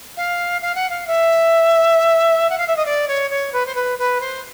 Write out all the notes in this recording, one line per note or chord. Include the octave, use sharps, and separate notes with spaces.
F5
F5
F#5
F5
E5
F#5
F5
E5
D#5
D5
C#5
C#5
B4
C5
B4
B4
C5